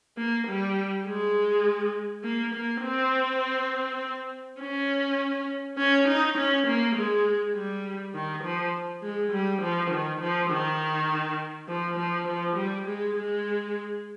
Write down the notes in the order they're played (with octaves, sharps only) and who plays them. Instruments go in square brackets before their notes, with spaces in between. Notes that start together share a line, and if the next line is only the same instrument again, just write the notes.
[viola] A#3
G3
G#3
A#3
A#3
C4
C#4
C#4
D#4
C#4
A#3
G#3
G3
D#3
F3
G#3
G3
F3
D#3
F3
D#3
F3
F3
F3
G3
G#3
G#3